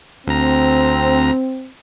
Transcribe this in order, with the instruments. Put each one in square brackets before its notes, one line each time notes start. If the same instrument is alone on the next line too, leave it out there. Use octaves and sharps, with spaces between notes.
[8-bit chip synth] D2 A#5 [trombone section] C4